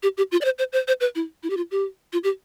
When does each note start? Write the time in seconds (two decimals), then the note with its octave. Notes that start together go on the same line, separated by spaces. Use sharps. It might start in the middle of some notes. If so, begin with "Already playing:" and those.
0.03 G4
0.17 G4
0.32 F4
0.41 D5
0.45 C5
0.59 C5
0.73 C5
0.88 C5
1.01 B4
1.15 E4
1.43 E4
1.50 G4
1.57 F4
1.71 G4
2.13 F4
2.24 G4